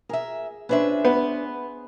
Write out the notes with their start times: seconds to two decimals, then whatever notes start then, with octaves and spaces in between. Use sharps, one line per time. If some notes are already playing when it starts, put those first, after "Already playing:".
0.09 G#4 A#4 E5
0.69 C#4 D4 B4 C5 E5
1.05 B3